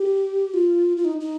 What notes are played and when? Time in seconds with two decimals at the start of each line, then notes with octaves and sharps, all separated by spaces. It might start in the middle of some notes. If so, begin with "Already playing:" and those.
Already playing: G4
0.54 F4
0.97 F4
1.05 D#4
1.21 D#4